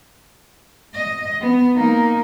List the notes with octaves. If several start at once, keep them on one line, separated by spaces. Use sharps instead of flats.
D#5
B3
A#3 D#4